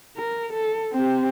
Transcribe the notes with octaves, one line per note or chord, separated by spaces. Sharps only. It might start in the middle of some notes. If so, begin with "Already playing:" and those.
A#4
A4
C4 G4